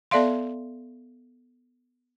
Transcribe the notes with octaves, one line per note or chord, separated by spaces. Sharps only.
B3 A4 D5 E5 F5 C6